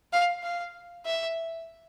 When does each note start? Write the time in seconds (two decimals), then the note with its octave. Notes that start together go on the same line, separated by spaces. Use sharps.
0.13 F5
0.43 F5
1.06 E5